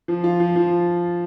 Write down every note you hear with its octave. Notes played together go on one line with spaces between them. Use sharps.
F3
F4
F3
F3